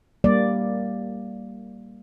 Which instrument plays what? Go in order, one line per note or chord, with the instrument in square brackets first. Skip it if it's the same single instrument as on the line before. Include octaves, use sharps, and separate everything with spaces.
[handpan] G3 A#3 D5